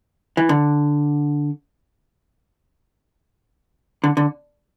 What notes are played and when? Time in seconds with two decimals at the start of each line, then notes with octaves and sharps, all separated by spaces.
0.37 E3
0.49 D3
4.04 D3
4.17 D3